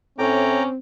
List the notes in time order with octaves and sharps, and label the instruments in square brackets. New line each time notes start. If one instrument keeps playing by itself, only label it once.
[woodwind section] A2 [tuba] C4 [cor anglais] C#4 [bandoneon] G5 A#5 D6